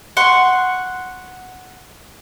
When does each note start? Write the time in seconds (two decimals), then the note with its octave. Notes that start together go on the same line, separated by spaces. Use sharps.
0.17 F#5 C6 C#6